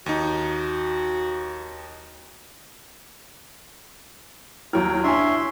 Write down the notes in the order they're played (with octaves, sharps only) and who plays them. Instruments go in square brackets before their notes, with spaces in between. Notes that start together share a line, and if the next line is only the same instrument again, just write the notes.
[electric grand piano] D#2 D#4 [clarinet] F#4
[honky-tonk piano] D#2 F#3 F6 [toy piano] E4 [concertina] G5
[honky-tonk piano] D4 G#5 [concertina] C#5 E5 C6